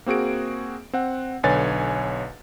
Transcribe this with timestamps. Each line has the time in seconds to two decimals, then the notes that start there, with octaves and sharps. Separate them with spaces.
0.06 A#3 C4 F#4 G#4 D7
0.93 C4 F#5
1.43 B1 D3 B4 C#5 G#5 A6